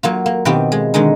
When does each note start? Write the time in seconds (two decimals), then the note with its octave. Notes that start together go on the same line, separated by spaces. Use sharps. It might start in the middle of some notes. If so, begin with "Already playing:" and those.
0.03 F#3 A#3 F4
0.26 A#3
0.45 B2 D#3 C4 F4 G4
0.72 G#3
0.94 D3 D#3 G#3 D#4